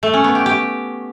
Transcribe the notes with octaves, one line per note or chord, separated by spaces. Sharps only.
A3
C#4
B3
G4
G4